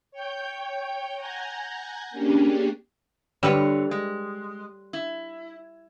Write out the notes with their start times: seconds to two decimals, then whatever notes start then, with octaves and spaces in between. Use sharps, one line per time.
0.11 C#5 G5 G6
1.15 F#5 G#5 A#5 G6 G#6
2.11 A#3 C#4 D4 G4 G#4
3.43 G2 D3 G3 B4 C#5
3.91 G#3
4.93 E4